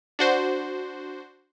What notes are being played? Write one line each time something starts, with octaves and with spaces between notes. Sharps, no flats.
D4 F#4 C5